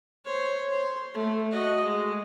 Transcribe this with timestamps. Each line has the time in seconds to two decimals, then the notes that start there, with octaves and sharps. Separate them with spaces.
0.25 C5 C#5
0.69 C5
1.14 A3
1.52 F#4 D#5
1.84 G#3